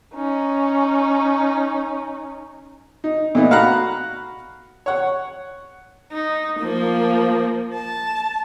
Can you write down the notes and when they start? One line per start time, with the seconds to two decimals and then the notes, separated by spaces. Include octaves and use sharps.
0.14 C#4 D#4
3.04 D#4
3.35 A#2 A3 B3 D#4
3.51 F#4 F5 F#5 A#5 B5 F#6
4.86 C#5 F#5
6.12 D#4
6.59 F3 A#3
7.73 A5